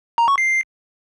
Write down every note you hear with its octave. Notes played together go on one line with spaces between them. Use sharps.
A#5
C#6
C7